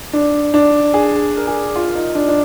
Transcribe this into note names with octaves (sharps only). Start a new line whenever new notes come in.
D4
D4
G#4
A#4
G#4
F4
D#4
D4
D4